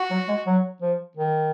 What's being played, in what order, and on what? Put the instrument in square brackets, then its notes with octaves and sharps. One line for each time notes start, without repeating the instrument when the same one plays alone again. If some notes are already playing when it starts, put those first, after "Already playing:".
Already playing: [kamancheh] F#4
[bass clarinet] F#3
G#3
F#3
F3
D#3